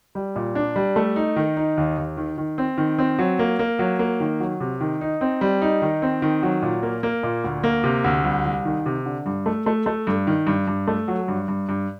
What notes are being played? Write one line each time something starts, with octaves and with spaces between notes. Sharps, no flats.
G3
A#2
D4
G3
A3
D#4
D#3
D#4
D#2
D#2
D#3
D#3
C4
D#3
C4
F#3
A#3
A#3
F#3
A#3
D#3
F#3
C3
D#3
D#4
C4
G3
D#4
D#3
C4
D#3
F#3
A#2
A#3
A#3
A#2
D2
A#3
C3
D2
C2
C2
D#3
C3
D3
G2
A3
A3
A3
G2
D#3
G2
G2
A3
F#3
G2
G2
G2